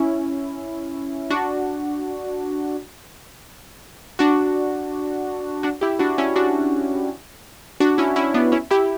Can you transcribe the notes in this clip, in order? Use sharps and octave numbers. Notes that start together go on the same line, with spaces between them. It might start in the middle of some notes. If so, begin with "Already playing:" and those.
Already playing: C#4 E4
D4 F#4
D4 F#4
D4 F#4
E4 G4
D4 F#4
C#4 E4
D4 F#4
D4 F#4
C#4 E4
C#4 E4
B3 D4
C#4 E4
E4 G4